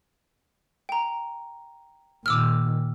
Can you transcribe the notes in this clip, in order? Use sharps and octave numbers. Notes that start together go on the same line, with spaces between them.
G5 A#5
A#2 D#3 D6 E6 F6